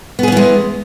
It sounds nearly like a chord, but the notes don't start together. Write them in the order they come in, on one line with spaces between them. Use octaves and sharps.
B3 G#4 C#4 E3 G#3